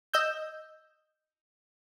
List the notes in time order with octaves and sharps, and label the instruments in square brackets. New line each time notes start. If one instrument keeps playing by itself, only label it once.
[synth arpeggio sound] D#5 E6 G6